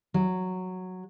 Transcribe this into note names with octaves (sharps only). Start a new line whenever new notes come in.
F#3